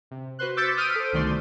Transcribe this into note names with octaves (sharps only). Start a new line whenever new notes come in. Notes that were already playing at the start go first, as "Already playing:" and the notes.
C3
F#4 B4 C5 C6 F#6
D6 E6 G6 A6 B6 C#7
D#6 F6 G6 B6 D7 D#7
A4 C5
C2 B2 D#3 A3 D5 C6